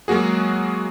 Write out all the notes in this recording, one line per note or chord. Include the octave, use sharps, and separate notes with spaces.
F#3 G#3 A#3 F#4 G#4